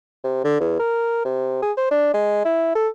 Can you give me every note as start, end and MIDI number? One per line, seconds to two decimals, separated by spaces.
0.24 0.41 48
0.44 0.57 50
0.60 0.77 40
0.79 1.24 70
1.25 1.58 48
1.62 1.72 68
1.77 1.89 72
1.91 2.09 62
2.14 2.44 56
2.45 2.71 64
2.75 2.88 69